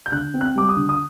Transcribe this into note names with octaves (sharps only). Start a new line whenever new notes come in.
G6
D3 F#6
C4
F#6
G3 D6
D#6
D3
D#6